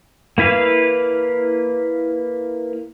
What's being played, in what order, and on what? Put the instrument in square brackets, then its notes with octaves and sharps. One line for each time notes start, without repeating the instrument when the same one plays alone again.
[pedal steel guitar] A#3 E4 B4 F5